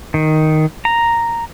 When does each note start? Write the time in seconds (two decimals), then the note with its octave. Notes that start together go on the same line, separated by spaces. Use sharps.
0.14 D#3
0.85 A#5